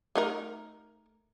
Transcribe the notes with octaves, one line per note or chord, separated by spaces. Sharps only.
A3 D#4 A#4